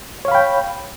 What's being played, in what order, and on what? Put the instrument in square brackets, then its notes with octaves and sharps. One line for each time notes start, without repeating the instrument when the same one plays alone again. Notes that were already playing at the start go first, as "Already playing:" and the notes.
[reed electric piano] C#5
F5
B5
G5